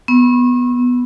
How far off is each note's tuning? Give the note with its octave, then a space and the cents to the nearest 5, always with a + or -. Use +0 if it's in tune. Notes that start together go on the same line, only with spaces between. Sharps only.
B3 +0 C#6 -45